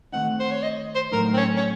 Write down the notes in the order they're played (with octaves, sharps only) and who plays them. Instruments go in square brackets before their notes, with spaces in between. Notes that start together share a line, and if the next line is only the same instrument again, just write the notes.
[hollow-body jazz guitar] D#3 A3 C4 D#4 [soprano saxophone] F#5
[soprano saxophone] C5
C#5
D#5
C5
[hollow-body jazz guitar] A2 F#3 A3 D#4 [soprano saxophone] A#4
[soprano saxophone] C4
C#4
C#4